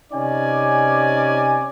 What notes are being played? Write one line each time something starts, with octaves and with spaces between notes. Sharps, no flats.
C3 C#4 D#4 D5 G#5